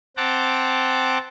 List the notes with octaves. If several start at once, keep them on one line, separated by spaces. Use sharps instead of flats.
C4 F#5 G5 A5 A#5 D6